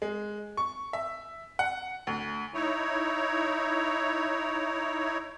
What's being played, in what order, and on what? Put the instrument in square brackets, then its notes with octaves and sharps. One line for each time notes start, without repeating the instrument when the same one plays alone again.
[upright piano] G#3
C#6
E5
F#5
D2
[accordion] D#4 E4 C#5